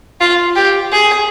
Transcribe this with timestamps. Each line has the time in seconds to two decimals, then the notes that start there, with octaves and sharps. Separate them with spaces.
0.20 F4
0.55 G4
0.92 G#4